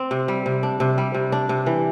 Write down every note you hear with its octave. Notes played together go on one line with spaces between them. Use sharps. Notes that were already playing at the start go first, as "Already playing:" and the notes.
Already playing: C4
C3
G3
C3
D4
C3
G3
C3
D4
C3
E3